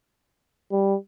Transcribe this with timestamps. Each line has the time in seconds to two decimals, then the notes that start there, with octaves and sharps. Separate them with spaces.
0.72 G3